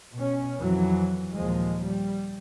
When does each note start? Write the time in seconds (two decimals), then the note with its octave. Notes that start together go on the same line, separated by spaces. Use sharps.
0.15 B2 C#4
0.57 F2 E3 F#3
1.34 D#2 A#2 F3 G#3
1.84 G3